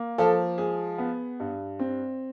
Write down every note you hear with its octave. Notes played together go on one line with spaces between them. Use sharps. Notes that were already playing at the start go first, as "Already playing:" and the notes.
Already playing: A#3
F3 A4
G#3 G#4
B3
G2
C4